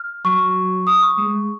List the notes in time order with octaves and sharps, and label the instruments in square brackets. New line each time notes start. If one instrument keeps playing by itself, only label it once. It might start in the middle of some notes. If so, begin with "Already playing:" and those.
Already playing: [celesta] F6
[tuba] F#3 [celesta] C#6
[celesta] D#6
C#6
[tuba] G#3